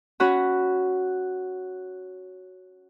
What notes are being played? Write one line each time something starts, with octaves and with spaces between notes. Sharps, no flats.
C#4 F#4 F#5 B5